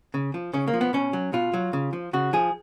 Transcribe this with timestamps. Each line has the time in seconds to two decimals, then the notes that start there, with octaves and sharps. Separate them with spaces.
0.14 C#3
0.34 F3
0.53 C#3 C#4
0.68 A#3
0.73 F3
0.81 B3
0.93 B2 C#4
1.13 F#3
1.33 B2 F4
1.54 F#3
1.73 C#3
1.93 F3
2.13 C#3 F#4
2.33 F3 G#4